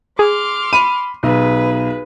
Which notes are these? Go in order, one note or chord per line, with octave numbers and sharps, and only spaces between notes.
G#4 C6 D6 F6
B5 D#7
B1 G#4 B4